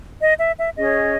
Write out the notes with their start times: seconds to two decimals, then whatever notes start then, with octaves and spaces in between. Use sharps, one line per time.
0.20 D#5
0.39 E5
0.58 E5
0.76 C#4 G#4 C#5 D#5